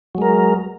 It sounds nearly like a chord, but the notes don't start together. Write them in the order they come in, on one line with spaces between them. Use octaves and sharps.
F#3 G#3 A#4